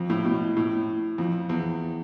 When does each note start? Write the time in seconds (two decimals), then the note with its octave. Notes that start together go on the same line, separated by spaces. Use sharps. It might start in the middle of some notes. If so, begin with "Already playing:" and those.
Already playing: F2
0.10 A2
0.25 B2
0.57 A2
1.18 F2
1.49 E2